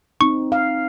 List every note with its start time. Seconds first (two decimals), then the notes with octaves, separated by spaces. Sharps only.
0.21 C4 D#4 C#6
0.52 F5